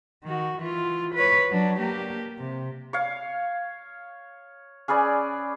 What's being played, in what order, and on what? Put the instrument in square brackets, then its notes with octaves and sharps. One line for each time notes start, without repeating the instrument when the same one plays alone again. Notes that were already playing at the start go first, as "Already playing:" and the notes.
[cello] D#3 F#4
E3 F4
B4 C#5
F#3 D4
A#3 G4
C3
[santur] C#5 F5
C#4 G#4 B4 D5